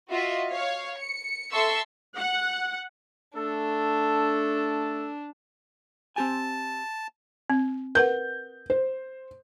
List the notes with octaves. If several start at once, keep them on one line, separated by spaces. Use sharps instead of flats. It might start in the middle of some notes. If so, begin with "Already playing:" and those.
F4 F#4 D#5 E5
C#5 F5
C#7
A4 E5 A5 C6 C#6 E6
F#5
A3 D4 A4
C4 G4 G#5 A5
C4
A#4 B4 F#5 G6
C5